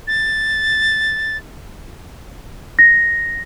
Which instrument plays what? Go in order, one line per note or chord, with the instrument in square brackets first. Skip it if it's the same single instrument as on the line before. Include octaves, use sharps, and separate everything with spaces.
[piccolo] A6
[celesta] A#6